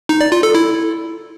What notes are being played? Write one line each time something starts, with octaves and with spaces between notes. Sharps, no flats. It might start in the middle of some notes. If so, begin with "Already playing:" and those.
D#4
D5
F4
A4
E4